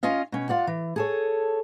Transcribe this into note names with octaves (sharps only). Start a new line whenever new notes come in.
C#4 F4 D#5 F5
B2 C#4
F4 D5 F#5
E3
G#4 A4 C#5